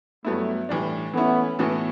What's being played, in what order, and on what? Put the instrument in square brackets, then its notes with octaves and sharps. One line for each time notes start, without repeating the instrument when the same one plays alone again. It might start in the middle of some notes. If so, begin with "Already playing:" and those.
[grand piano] G2 F#3 B3 E4 [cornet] A3
[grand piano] A2 E3 G3 D4
[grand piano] E3 A3 C#4 E4 [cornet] B3
[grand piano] A2 E3 B3 F#4 A4